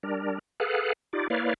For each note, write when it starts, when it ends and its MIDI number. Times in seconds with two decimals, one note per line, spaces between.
0.03 0.39 55
0.03 0.39 62
0.03 0.39 70
0.60 0.93 68
0.60 0.93 69
0.60 0.93 71
0.60 0.93 77
0.60 0.93 78
1.13 1.28 63
1.13 1.28 65
1.13 1.28 67
1.13 1.28 74
1.30 1.54 58
1.30 1.54 64
1.30 1.54 71
1.30 1.54 73
1.30 1.54 74
1.30 1.54 77